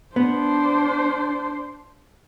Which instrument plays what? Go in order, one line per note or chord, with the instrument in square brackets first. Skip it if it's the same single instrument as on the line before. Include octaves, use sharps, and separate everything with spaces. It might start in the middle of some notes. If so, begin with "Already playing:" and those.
[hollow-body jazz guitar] B3 [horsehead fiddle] D4 C5